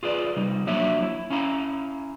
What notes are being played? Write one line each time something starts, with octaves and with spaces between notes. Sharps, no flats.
F4 G#4 B4 D5
C3 G3 D#4
F3 F#3 A#3 D4 C#5 E5
E4
C#4 E4 F5 A#5